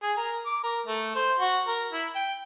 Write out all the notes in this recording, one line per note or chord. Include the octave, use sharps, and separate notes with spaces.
G#4
A#4
D6
A#4
A3
C5
F#4
A#4
E4
G5